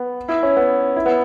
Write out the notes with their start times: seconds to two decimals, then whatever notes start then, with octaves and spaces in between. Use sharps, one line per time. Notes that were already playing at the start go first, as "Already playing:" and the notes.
Already playing: B3
0.29 E4
0.43 C#4
0.56 B3
0.96 E4
1.06 B3